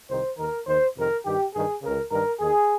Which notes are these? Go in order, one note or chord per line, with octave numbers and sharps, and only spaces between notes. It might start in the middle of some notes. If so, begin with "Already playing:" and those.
C2 C3 D#3 C5
D#2 D#3 A#4
D#2 D#3 C5
F2 C3 D#3 A#4
G2 D#3 G4
G2 D#3 G#4
C#2 C#3 A#4
G2 D#3 A#4
D#2 D#3 G#4